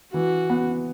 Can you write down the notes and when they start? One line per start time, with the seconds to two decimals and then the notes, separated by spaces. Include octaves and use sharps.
0.13 E3 F#4
0.50 B3